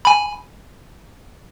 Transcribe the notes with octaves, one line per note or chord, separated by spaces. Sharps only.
G#5 B5